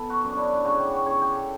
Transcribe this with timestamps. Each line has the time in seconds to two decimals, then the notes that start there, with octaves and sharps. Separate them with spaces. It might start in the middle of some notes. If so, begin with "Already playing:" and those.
Already playing: B3 A4
0.10 F#4
0.23 F#2
0.30 D4
0.37 E4
0.65 C#3 F#4
0.78 G4
0.93 F#4
1.06 C#3 C#5
1.22 G4
1.35 A4